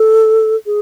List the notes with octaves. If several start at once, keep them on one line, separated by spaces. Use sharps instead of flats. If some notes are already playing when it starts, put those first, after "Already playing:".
Already playing: A4
G#4